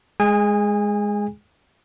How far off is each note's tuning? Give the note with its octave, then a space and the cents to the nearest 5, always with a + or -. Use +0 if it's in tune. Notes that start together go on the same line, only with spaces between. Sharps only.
G#3 +0 G#4 +0 G#5 -30